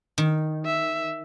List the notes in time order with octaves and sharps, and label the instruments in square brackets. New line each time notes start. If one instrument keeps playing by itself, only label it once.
[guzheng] D#3
[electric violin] E5